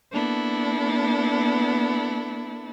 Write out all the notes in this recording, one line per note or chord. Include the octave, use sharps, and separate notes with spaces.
A#3 B3 D4 E4 A4